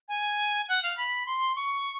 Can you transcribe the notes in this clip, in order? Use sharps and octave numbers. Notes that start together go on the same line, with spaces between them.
G#5
F#5
F5
B5
C6
C#6